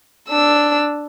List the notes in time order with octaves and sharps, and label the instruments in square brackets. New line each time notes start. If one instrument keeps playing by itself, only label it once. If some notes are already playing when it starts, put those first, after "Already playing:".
[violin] D4 E6